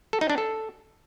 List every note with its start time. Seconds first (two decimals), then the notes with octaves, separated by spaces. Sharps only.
0.13 A4
0.21 D#4
0.30 D4
0.38 A4